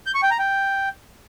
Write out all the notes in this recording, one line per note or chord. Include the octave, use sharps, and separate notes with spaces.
G6
C#6
G5
A#5
G5